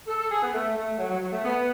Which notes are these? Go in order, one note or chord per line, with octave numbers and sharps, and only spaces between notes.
A4
A4
G#4
B3
A3
A3
F#3
F#3
F#3
A3
B3